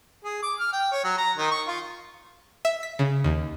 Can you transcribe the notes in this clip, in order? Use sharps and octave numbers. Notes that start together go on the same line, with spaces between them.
G#4
D6
F6
G5
C#5
F#3
A#5
D#3
C#6
F4
E5
B6
C#3
D#2